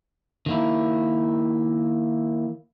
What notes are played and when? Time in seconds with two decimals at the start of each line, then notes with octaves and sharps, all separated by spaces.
0.46 D#3 A#3 E4